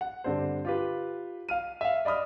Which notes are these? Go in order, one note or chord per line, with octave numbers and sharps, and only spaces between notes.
F#5
G2 D3 C4 D4 C5
F4 G4 B4
F5 F6 D#7
E5 F5
D5 D#5 B5 D#6 F6